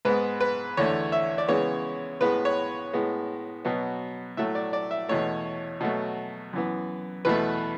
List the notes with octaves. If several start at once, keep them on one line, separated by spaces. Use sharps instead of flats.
G#2 G#3 B3 B4
B4
E2 D3 A3 C#5
E5
D5
C#3 E3 G#3 B3 C#5
A2 G#3 B3 B4
C#5
A2 G#3 B3
B2 F#3 B3
A2 F#3 A3 E5
D5
D5
E5
E2 B2 A3 C#5
B2 F#3 A3
F#2 E3 B3
E2 B2 A3 B4